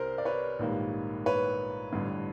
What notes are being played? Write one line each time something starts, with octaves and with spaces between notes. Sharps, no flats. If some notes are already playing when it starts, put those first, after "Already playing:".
Already playing: C2 C3 A#4 C5
D5
B4 C#5
A#1 G#2 D#3 G3 A#3
B4 C#5
A1 G2 D3